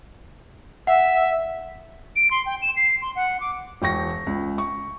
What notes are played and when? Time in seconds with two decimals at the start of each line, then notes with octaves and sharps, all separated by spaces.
0.87 E5 F#5
2.16 D7
2.31 C6
2.46 G5
2.62 E7
2.76 C7
3.02 C6
3.16 F#5
3.40 D6
3.82 E1 G5 C#6 A#6
4.26 C#2
4.58 C#6